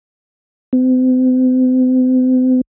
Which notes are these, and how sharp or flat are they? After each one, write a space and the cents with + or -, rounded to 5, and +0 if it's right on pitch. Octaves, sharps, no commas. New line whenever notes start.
C4 -40